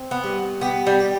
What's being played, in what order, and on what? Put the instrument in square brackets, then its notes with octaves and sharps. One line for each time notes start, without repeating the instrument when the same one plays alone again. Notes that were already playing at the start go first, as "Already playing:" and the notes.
Already playing: [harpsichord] C4
[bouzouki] B3
[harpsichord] G2
[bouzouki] B3 [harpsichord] G4
[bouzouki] G3
[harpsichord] G4